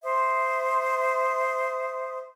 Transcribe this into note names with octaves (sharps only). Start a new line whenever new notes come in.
C5 E5 D#6